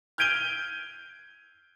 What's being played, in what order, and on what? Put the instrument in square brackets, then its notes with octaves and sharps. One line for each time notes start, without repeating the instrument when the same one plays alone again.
[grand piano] F6 G6 G#6 D7 D#7 G7